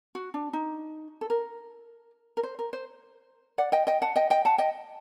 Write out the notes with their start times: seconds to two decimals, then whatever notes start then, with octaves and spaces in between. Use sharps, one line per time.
0.15 F#4
0.34 D4
0.53 D#4
1.21 A4
1.30 A#4
2.37 A#4
2.43 C5
2.59 A#4
2.73 C5
3.58 D5 F#5
3.72 D#5 G5
3.87 D#5 G5
4.02 F#5 A5
4.16 D#5 G5
4.30 D#5 G5
4.45 F#5 A5
4.58 D#5 G5